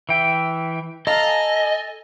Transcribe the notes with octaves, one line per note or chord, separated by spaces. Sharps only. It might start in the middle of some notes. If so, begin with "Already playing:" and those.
E3 E5 G5
A4 D#5 F5 A#5
G#5